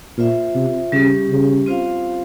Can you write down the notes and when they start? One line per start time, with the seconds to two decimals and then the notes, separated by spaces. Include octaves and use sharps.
0.18 A#2 F4 C5 E5
0.55 C3
0.92 C#3 G3 C#4 G4
1.29 C#3
1.66 C4 F4 C5 F5